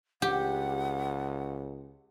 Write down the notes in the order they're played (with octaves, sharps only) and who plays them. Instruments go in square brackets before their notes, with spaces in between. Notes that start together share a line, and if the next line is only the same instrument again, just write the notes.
[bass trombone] C#2 [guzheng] G4 [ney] F#5